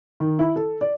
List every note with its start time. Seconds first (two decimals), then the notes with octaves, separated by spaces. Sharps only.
0.20 D#3
0.39 E4
0.56 A4
0.81 D5